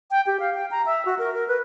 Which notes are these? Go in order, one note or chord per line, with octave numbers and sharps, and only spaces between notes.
G5
G4
F5
G5
A#5
E5
F#4
A#4
A#4
B4